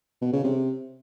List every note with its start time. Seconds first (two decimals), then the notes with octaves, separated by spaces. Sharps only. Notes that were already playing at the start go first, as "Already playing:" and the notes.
0.22 B2
0.33 C#3
0.44 C3